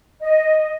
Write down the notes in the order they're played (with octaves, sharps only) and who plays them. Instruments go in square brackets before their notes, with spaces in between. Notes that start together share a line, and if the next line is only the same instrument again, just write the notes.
[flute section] D#5